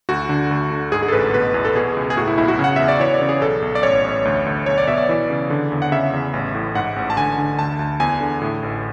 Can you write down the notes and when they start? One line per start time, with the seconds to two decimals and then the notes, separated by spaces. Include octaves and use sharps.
0.09 D2 F#4
0.29 D3
0.51 D2
0.71 D3
0.92 G#2 G#4
1.03 G#4
1.08 A4
1.12 A1 B4
1.33 B2 B4
1.54 E2
1.65 A4
1.75 B2 G#4
1.97 C#2
2.10 G#4
2.17 A2 F#4
2.27 E4
2.38 B1 E4
2.48 F#4
2.59 C#3
2.64 F#5
2.76 E2 E5
2.88 D5
3.00 E3 C#5
3.14 D5
3.21 C#3
3.29 G#4
3.41 B1 A4
3.62 B1
3.75 D5
3.83 A1 C#5
4.05 A1
4.25 D2
4.46 D2
4.66 B1 C#5
4.78 D5
4.88 B2 E5
4.98 D5
5.09 E3
5.30 C#3
5.50 D3
5.72 E2
5.82 F#5
5.92 C#3 E5
6.13 E2
6.34 A1
6.54 A2
6.75 G#2 F#5
6.96 A1
7.10 A5
7.17 D3 G#5
7.38 D3
7.58 D2 A5
7.79 D2
8.00 E2 G#5
8.21 D3
8.42 A2
8.63 A1